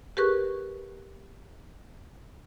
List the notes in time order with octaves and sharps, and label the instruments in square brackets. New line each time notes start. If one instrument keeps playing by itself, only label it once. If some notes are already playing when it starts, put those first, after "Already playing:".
[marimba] G4 G#4 A#4 B4 C#6 F#6